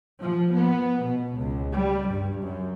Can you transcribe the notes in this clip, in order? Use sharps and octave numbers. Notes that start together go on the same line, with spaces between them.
F3
B3
B2
C#2
G3
G2
F#2